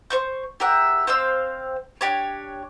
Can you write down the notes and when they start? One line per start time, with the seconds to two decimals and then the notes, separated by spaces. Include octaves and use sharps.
0.10 C5 C#6 G6
0.60 G4 A#4 E5 F#5
1.07 C4 C5 F5 E6
2.01 D4 G4 C#5